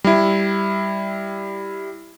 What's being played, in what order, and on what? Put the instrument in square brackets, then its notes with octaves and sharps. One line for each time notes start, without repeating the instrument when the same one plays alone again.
[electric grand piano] G3 E4